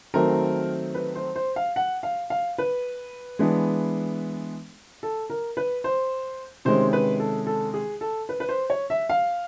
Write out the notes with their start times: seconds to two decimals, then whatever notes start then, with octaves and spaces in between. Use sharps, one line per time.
0.14 D#3 F#3 A3 C4 A#4
0.94 B4
1.15 C5
1.35 C5
1.56 F5
1.76 F#5
2.03 F5
2.30 F5
2.58 B4
3.39 E3 G#3 B3 D4
5.03 A4
5.30 A#4
5.57 B4
5.84 C5
6.65 C3 D#3 G#3 C#4 C5
6.93 B4
7.20 A4
7.47 A4
7.74 G#4
8.01 A4
8.29 B4
8.40 B4
8.49 C5
8.70 C#5
8.90 E5
9.09 F5